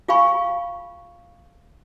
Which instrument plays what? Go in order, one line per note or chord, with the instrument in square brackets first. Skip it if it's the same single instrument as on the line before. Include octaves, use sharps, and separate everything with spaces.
[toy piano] F4 G#4 F5 G#5 B5 C#6